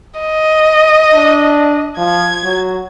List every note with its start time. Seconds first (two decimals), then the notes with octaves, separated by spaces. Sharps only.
0.20 D#5
1.13 D4
1.98 F3 G#6
2.45 F#3